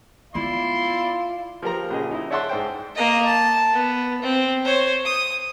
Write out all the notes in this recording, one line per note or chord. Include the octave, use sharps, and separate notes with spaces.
B3 E4 F4 D5 C6
F3 G4 A#4 A#5
A#1 C#3 G#4 D#5
D#4 E4
C#5 D5 E5 F#5 A5 C6
G#2 C5 G5
A#3 D#5
A5
B3
C4
C5 C#5
D#6